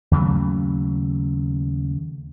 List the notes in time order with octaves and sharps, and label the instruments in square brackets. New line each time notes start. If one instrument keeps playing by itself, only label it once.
[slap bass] D#2 C#3 F#3 A3